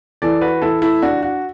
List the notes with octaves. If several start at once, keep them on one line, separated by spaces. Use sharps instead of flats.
E3 A4 D5
F#4 B4
E3 E4 A4
E4 A4
D4 F#4
F#4